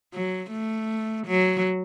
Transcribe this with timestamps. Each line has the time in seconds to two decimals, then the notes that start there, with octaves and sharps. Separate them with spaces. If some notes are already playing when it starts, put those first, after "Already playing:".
0.14 F#3
0.51 A3
1.27 F#3